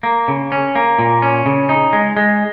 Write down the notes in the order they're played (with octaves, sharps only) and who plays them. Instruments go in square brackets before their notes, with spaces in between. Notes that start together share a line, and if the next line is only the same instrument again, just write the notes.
[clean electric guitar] A#3
C#3
C#4
A#3
A#2
C#4
C#3
D#4
G#3
G#3